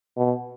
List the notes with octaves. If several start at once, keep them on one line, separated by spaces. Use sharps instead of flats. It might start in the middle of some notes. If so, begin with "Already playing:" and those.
B2